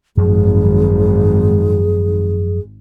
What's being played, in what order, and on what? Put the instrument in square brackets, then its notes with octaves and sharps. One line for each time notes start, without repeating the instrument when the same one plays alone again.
[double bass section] G#1 [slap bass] F#2 F3 F#3 [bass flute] G#4